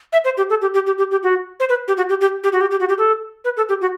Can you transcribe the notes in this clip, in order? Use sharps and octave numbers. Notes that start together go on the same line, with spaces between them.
E5
C5
G4
A4
G4
G4
G4
G4
G4
F#4
C5
B4
G4
F#4
G4
G4
G4
F#4
G4
G4
F#4
G4
A4
B4
A4
G4
F#4